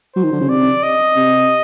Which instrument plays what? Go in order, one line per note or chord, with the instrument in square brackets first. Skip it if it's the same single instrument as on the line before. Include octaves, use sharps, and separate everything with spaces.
[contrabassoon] F#3 [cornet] C5
[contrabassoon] D#3
D3
C#3
[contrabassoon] C3 [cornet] D5
[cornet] D#5
[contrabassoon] C3